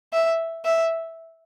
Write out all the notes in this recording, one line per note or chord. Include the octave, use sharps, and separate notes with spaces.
E5
E5